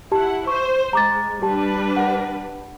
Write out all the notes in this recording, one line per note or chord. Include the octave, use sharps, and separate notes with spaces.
E4 G4 F#5 A5
C5 C#6
G#3 A#5 D6 A6
G3 D4 G4 B4 A5
F#5